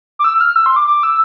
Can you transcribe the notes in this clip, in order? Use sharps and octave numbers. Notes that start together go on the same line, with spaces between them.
D6
E6
F6
E6
C6
D6
D6
E6